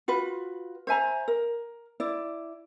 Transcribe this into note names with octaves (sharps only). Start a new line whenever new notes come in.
F4 F#4 B4
C5 E5 G#5 A#5
A#4
E4 D5